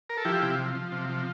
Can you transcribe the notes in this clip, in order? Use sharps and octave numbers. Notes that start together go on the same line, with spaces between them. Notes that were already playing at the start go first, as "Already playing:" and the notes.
A#4
A4
F3 E4 G4
C3
F3
F3
C3
F3